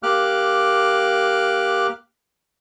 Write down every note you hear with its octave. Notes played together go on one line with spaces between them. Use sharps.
A#3 G4 D6 F6 F#6